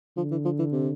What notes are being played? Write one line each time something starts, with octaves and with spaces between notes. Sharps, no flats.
D3 F3
E3
F3
E3
C3